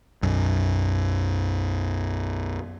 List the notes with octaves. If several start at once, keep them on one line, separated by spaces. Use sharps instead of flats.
B1 F#2